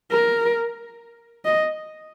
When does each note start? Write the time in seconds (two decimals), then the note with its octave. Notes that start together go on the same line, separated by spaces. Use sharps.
0.11 A#4
1.45 D#5